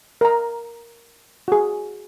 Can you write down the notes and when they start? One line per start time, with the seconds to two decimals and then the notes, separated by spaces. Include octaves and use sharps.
0.21 A#4 A#5
1.48 F#4 G#4